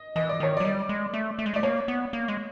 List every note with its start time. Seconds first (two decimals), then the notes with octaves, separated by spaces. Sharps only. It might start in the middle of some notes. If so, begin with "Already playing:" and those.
Already playing: D#5
0.16 E3 D#5
0.29 D5
0.40 D#3 C#5
0.57 F#3 D5
0.65 G3
0.89 G#3
1.14 A3
1.39 A3
1.46 G#3
1.54 A3 D5
1.63 A#3 C#5
1.88 B3
2.13 A#3
2.28 G#3